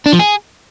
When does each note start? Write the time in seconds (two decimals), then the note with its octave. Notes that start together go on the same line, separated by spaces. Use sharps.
0.06 D4
0.13 F3
0.19 G#4